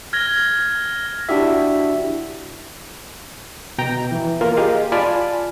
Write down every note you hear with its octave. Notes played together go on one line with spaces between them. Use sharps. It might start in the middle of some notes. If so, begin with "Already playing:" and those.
F6 G#6 A#6 G7
D4 E4 F#4 G4 E5
B2 G5 A#5
E3
A#3 F4 A#4
G4 G#4 D#5 F5
F4 D5 G#5 A5 B5 F6